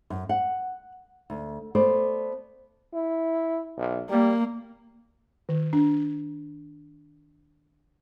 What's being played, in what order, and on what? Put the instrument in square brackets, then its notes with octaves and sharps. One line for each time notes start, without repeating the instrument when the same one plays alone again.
[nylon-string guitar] F#2
F#5
D2
A3 B3 C5 D5
[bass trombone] E4
B1
[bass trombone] G3 [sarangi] A#3
[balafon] D#3
D4